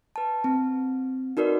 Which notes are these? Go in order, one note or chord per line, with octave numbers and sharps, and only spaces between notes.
B4 A5
C4
D#4 F#4 A#4 B4 D5